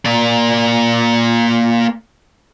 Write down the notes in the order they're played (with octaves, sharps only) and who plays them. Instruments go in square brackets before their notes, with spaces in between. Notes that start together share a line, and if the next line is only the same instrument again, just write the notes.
[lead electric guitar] A#3 D5